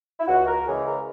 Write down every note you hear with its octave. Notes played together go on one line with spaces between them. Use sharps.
E4
C#2 F#4
A#4
C#3 E3 G#3 G#4
A#4